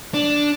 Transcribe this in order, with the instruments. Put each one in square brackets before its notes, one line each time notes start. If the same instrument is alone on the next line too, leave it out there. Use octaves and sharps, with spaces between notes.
[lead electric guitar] D4